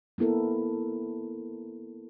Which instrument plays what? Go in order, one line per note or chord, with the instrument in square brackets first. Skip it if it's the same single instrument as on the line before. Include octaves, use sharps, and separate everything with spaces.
[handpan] A#3 B3 E4 A4 A#4